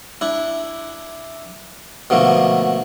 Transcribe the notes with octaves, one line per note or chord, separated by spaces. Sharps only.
D4 E4
B2 D3 F3 A3 A#3